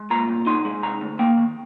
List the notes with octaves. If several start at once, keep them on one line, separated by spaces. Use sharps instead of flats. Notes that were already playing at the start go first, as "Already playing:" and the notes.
Already playing: G#3
A#2 A#5
C2
D#4 C6
G#3
C3 A#5
D2
A#3 G5
D#3